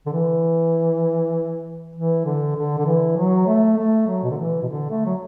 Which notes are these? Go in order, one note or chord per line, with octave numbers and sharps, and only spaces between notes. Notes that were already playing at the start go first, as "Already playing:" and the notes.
D3
E3
E3
D3
D3
D3
E3
F#3
A3
A3
F#3
B2
D3
E3
B2
D3
A3
F#3